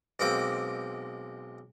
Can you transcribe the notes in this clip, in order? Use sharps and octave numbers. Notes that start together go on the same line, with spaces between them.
B1 G#3 A#3 C4 G5 D6